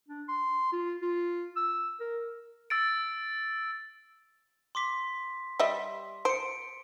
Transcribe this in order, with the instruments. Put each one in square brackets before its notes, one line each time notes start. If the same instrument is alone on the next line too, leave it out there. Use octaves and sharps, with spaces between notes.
[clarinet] D4
C6
F4
F4
E6
A#4
[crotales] E6 A6 D7
[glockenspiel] C6 D6 B6
[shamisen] G3 D#5 E5
[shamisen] C5 [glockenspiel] C#7 D7